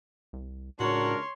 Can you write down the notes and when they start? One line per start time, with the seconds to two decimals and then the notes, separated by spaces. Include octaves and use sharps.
0.33 C2
0.80 C#2 A2 D4 F#4 A#4 C#5 C6